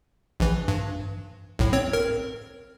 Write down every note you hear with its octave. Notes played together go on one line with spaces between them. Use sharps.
A#1 E3
G2
B1 A2
C4 C#5
A#4